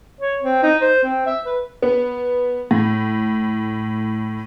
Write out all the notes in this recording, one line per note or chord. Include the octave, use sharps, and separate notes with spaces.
C#5
C4
D#4
C5
C4
E5
B4
B3
A2